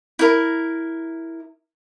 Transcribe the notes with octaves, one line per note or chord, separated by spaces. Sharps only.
E4 A#4